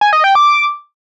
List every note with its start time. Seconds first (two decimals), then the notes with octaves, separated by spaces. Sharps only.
0.01 G#5
0.13 D#5
0.24 G5
0.35 D6